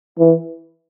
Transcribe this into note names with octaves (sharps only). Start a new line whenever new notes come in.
E3